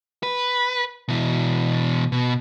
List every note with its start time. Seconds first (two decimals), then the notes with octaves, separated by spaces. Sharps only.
0.23 B4
1.08 B2 E3
2.12 B2